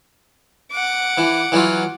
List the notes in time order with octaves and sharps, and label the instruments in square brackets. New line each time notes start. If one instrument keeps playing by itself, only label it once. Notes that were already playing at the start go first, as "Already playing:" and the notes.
[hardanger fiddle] F#5 D6
[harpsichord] E3
E3 F#3 F4